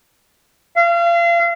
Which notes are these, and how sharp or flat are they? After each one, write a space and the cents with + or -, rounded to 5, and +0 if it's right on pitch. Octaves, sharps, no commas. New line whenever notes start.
F5 -35